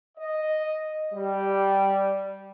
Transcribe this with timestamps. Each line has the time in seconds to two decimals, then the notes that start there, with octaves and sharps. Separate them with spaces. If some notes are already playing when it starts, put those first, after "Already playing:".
0.17 D#5
1.13 G3